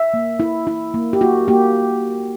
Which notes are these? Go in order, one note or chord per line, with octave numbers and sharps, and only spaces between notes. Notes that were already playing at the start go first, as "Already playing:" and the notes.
Already playing: E5
A#3
E4
E4
A#3
G4
A#3 F#4
A#3 G4